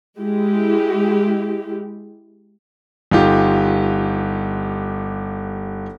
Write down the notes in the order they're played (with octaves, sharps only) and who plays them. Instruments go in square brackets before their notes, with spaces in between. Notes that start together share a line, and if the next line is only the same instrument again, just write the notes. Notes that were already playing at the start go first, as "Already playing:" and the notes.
[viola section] G#3 E4 G4
[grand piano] G1 D#4 F4 G4